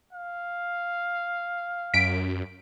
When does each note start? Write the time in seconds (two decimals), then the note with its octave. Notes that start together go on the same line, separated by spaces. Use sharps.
0.13 F5
1.94 F#2 B6 D7